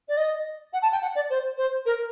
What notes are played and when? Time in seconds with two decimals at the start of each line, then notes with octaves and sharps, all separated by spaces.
0.08 D5
0.17 D#5
0.73 F#5
0.82 A5
0.92 G5
1.01 F#5
1.15 D5
1.29 C5
1.57 C5
1.85 A#4